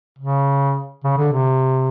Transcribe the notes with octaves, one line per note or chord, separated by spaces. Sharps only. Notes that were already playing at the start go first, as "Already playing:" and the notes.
C#3
C#3
D3
C3